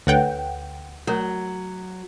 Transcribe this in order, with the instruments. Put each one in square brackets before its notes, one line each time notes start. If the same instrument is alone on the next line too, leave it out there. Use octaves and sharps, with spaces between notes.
[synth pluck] D2 F#5 G5 [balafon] A4 B4 C#5
[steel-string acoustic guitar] F#3 [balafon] A3 F#4 A#4